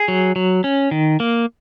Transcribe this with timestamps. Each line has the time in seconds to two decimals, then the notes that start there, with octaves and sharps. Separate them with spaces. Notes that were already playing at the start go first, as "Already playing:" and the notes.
Already playing: G#4
0.08 F#3
0.36 F#3
0.64 C#4
0.91 D#3
1.20 A#3